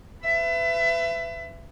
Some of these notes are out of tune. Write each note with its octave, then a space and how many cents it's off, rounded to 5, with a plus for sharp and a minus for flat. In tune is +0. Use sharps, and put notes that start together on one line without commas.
B4 +30 E5 +30